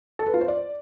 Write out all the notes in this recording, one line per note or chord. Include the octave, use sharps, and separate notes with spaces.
A4
B4
F4
C5
D5